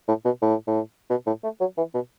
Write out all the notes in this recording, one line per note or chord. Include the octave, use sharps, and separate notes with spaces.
A2
B2
A2
A2
B2
A2
A3
F#3
E3
B2